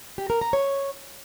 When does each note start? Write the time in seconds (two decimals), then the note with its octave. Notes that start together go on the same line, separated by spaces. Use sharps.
0.18 G4
0.30 A#4
0.41 A#5
0.53 C#5